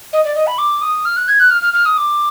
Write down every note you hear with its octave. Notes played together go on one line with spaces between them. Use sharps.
D#5
D5
D#5
B5
D6
D#6
F6
F#6
G#6
F#6
F6
F6
F6
D#6
D6